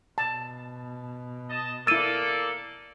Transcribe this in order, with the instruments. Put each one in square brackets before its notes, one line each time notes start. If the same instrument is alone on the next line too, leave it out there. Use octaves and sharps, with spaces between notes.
[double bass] B2 [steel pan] A5
[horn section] D#5 A5
[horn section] A#3 A4 D5 [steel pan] E4 E6 [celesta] A6 D#7